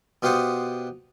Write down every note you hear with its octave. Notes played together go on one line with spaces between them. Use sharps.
B2 F4 G4 C5 F#5 D#6